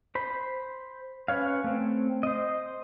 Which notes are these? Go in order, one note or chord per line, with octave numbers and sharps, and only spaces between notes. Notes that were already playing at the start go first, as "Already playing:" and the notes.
C5 B5
C#4 B4 C#5 F5
A3 C4
C5 D#5